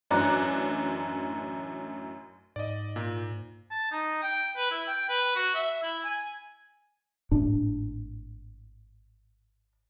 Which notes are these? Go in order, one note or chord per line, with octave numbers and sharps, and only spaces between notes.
A1 F#2 D4 A#5 D6 F#6
G#2 D5 D#5
A#2
A5
D#4
G5
B4
E4
G5
B4
F#4
E5
E4
G#5
G#1 A2 D4